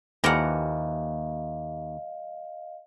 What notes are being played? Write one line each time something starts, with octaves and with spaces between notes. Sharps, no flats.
D#2 E3 F3 G3 A#4 D#5 F5 F#5